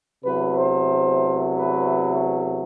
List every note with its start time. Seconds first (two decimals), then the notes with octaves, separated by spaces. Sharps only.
0.24 E2 C3 F#3 A3 B4
0.57 C5
1.56 B4